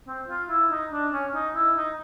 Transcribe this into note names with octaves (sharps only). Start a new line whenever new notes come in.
C4
F4
E4
D#4
D4
C#4
D#4
E4
D#4